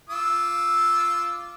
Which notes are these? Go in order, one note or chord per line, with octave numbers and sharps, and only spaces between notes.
F4 D6 E6